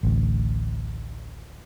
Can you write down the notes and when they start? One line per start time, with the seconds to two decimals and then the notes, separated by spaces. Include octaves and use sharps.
0.03 A1 D2